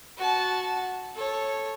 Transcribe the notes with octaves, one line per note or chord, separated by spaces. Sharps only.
F#4 A5
A4 C#5